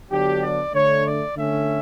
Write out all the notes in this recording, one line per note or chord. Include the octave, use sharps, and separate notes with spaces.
D3 F#3 B3 D4 G4
D5
D3 A3 D4 C#5
D5
D3 A3 C#4 E5